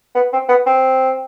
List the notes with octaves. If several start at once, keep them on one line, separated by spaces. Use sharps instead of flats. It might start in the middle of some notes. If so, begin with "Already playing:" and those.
B3
C4
B3
C4